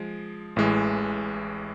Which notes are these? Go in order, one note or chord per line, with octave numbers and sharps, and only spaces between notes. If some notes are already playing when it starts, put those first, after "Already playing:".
Already playing: F3 G#3
A1 A2 E3 G#3